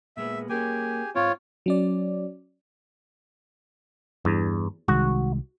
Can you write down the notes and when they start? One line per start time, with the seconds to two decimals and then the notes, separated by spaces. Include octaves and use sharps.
0.17 A#2 G#3 B3 E5
0.50 A#3 C#4 G4 G#4 G#5
1.15 G#2 C4 F4 C#5
1.66 F#3 C#4 D5
4.25 E2 G2
4.88 C2 D#3 G#3 F#4